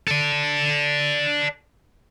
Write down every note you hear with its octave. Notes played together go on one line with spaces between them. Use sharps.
A4 D5